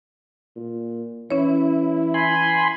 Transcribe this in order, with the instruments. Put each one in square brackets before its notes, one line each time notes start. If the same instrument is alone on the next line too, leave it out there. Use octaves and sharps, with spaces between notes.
[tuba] A#2
[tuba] E3 [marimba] C#4 C#5 [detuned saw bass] E4
[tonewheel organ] G#5 B5 C6